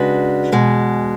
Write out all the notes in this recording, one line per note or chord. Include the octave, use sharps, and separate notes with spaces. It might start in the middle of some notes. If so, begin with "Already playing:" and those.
Already playing: C#3 G#3 D4 F#4 B4
E2 B2 G#3